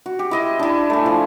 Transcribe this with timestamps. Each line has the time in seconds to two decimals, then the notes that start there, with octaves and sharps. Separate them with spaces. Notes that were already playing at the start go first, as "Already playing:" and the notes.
0.06 F#4
0.19 G4
0.31 E4 D#5 C6
0.59 D4 E4
0.90 A3 G#5
1.06 F3